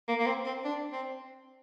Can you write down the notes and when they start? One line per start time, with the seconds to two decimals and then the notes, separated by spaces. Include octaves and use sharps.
0.08 A#3
0.19 A#3
0.26 C4
0.46 C4
0.65 D4
0.93 C4